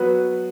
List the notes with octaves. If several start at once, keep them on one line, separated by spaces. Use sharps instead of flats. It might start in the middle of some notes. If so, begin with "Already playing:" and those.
Already playing: F#3 B3 F#4 B4